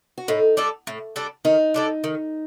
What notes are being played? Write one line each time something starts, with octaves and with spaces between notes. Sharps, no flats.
F#4
A2 D#4
G3 D4 A4
A2
G3 D4 A4
D#3 D#4
G3 D4 A4
D#3